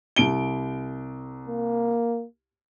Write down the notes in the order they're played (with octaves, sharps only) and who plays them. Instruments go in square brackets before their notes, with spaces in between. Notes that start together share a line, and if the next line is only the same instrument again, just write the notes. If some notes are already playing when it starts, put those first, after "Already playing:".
[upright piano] C2 D7 G7
[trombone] A#3